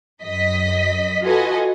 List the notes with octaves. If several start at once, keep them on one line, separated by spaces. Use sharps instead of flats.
F#2 D#5 B6
F4 F#4 A4 B4 D#5 G#5